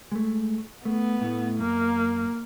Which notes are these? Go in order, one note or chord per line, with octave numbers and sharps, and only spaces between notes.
G#3 A3
A3 B3
A2 A3
F#2 A#3